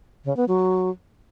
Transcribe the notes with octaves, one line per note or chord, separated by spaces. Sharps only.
C#3
B3
F#3